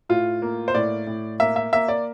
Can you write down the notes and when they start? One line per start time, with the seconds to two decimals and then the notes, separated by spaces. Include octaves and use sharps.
0.09 A2 F4
0.42 A#3
0.68 C5
0.74 A2 D5
1.07 A2
1.40 A#3 E5
1.56 E5
1.73 A#3 E5
1.88 D5